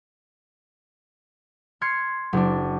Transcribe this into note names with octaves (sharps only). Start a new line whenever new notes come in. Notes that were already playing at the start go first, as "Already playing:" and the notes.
C6 F6 G#6 C7 C#7
F#1 D4